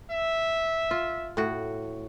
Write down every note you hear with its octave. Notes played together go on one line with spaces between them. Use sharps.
E5
F4
A2 F#4